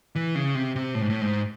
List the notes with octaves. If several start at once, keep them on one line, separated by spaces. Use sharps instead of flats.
E3
C#3
C3
C3
A2
G#2
A2
G#2